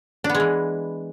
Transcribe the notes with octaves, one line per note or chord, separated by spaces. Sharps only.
D4
B3
G#3
E3